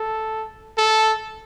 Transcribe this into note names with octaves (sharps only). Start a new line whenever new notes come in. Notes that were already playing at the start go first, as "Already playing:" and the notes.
Already playing: A4
A4